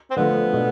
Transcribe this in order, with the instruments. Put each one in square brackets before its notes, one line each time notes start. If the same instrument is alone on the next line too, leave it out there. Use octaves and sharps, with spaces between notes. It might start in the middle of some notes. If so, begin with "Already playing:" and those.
[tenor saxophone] C4
[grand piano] D3 F3 A3 [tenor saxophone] B3
[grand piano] B2 A3 D4